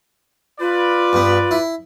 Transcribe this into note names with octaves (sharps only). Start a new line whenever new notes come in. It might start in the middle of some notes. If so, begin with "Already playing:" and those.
F4 B4 D5
G2 B3
E4